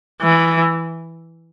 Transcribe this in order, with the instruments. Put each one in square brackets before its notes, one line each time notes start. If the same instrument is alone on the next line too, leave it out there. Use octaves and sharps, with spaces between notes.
[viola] E3